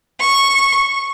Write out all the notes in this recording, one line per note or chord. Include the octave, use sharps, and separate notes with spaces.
C#6